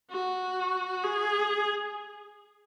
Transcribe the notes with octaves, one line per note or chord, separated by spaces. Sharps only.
F#4
G#4